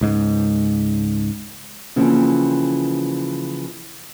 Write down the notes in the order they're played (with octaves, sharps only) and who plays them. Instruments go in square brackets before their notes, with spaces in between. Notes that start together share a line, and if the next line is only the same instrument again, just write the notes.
[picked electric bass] C#2 G#2
[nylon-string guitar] C#3 E3 F3 A#3 C4